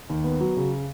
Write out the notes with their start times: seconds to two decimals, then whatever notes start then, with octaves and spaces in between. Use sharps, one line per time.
0.10 D#2
0.24 B3
0.41 F#3
0.57 C#3